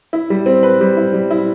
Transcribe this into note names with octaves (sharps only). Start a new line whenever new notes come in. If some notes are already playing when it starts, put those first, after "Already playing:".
E4
G3
C4
B4
G3
E4
G3
E4